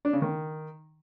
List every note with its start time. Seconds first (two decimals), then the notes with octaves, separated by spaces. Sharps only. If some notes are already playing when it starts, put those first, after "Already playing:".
0.05 D4
0.13 C#3
0.22 D#3